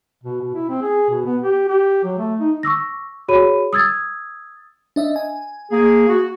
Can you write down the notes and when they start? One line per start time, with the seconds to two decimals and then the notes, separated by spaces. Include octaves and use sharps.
0.24 B2
0.41 B2
0.55 E4
0.70 C4
0.82 G#4
1.10 B2
1.26 B3
1.42 G4
1.68 G4
2.04 F#3
2.19 A3
2.40 D#4
2.63 C#6 D6 E6 A#6
3.28 F#4 G#4 C#5 B5 D#7
3.73 D#6 E6 G#6 A6
4.96 D4 D#5 E5
5.16 G#5
5.71 A#3 G#4
6.09 F#4